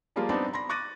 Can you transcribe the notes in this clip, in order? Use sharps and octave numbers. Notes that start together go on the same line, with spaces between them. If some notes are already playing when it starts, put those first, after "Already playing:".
F3 G3 G#3 A#3 F4
G3 B3 C4 D4 D#4
B5 C6 A#6
C#6 D6 F#6 A6 A#6 D#7